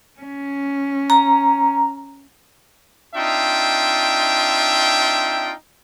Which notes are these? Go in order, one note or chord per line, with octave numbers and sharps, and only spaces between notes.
C#4
A#5
C4 D4 D#4 F4 E5 G5